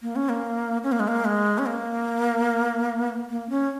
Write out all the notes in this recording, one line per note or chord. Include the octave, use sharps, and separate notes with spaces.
A#3
C#4
A#3
C#4
A#3
G#3
A#3
G#3
C#4
A#3
A#3
C#4